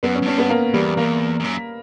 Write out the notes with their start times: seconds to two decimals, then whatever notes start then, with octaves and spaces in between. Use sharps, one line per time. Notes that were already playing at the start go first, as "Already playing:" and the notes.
0.03 F#2 B3
0.15 C#4
0.22 F#2
0.26 G2 C#4
0.38 B3
0.50 A#3
0.74 E2 G3
0.97 E2 A#3
1.40 E2
1.44 F#2